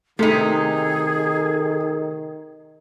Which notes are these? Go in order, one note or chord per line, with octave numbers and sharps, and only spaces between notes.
C3 D#3 A3 D#4 G#4